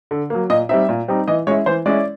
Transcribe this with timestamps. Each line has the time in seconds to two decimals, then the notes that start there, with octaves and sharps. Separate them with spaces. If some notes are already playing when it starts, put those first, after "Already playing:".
0.11 D3
0.30 F#3 A#3
0.50 A#2 D#5
0.69 G3 C4 D#4 E5
0.89 A#2
1.08 G3 C4 D#4
1.28 E3 D#5
1.47 G#3 C#4 E4 C#5
1.66 E3 C5
1.86 G#3 C#4 E4 D5